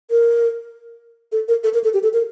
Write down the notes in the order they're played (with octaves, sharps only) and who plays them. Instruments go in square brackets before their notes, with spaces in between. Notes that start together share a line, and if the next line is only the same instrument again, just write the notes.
[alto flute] A#4
A4
A#4
A4
A#4
A4
G4
A4
A#4